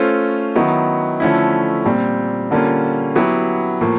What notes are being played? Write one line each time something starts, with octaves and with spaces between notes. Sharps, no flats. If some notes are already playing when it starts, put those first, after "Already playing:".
Already playing: A3 C#4 F4 A4 C5
D#3 F#3 B3 E4
D3 F3 A3 C#4 E4
A#2 G3 C4
D3 G3 A#3 C#4 F4
F#3 B3 E4 G4
A2 F3 A#3